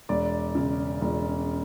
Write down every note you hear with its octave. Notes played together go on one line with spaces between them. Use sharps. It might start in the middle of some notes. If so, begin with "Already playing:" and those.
E1 D5
C#3
E1